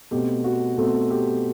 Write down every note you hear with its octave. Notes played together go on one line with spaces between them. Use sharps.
B2 A3 C4 G4
F#4
B2 A3 C4 F#4
G4